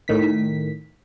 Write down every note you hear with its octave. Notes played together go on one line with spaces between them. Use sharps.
A2 D#3 B6